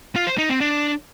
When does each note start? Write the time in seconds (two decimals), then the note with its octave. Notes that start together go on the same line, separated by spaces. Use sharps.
0.16 F4
0.27 C5
0.38 D#4
0.49 C4
0.60 D4